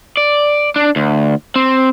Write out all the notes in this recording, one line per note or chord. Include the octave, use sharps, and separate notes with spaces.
D5
D4
D2
C4